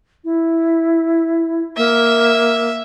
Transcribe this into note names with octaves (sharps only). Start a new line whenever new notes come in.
E4
A#3 E5